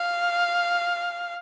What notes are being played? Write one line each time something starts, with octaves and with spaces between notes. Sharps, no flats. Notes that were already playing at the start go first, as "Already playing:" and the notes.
Already playing: F5